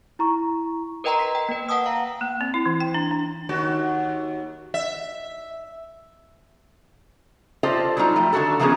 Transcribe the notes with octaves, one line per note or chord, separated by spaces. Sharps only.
E4 A#5 C#6
A#4 B4 D#5 G5 A#5 C6
B6
G5
A#3 B4
F#5 G5 A5 D#6 E6
F5 A#5
A#3
C4
E4
E3
G5
D4
D4
D#2 F#4
E5
F4 G4 A4 C5 D5 D#5
F#3 G3 D4 D#4 F4
F3 G3 A3
D3 D#3 D4 F#4 A4
D#3 F3 A#3 B3 C#4 G#4